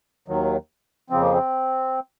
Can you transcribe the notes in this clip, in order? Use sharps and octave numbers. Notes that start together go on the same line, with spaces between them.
D#2 D#3 F#3
F2 C#3 F3 C4
A#3
C4